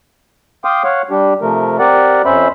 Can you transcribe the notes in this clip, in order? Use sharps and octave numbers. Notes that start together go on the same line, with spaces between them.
F5 G5 C6 D6 D#6
C#5 F5 F#5
G3 D4 G4
C3 F3 A3 A#4
C4 G4 A#4 D5 F#5
F2 C#4 C5 E5 B5